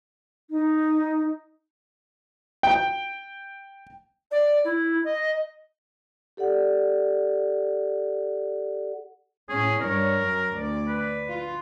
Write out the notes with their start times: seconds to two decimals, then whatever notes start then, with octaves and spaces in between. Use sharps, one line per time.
0.50 D#4
2.63 G5
4.31 D5
4.64 E4
5.04 D#5
6.37 G4 A4 D5 F#5
9.49 A2 C#4 G#4
9.81 G2 A#4 C#5
10.21 F#2
10.55 D2 D5
10.88 B4
11.28 F4